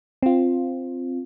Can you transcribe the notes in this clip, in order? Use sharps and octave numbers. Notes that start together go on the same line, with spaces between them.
C4 F4